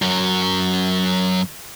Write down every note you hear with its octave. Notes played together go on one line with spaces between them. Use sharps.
F#2 F#3